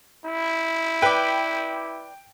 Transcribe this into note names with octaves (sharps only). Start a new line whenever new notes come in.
E4
B4 D5 G5